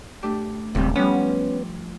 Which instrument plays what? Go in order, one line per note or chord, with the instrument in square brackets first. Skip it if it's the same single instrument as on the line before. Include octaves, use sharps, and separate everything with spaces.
[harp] A3 D4 G4
[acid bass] D#1 [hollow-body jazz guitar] C#2 C3 G3
[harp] F3 G3 [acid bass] B3 [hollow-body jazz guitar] C#4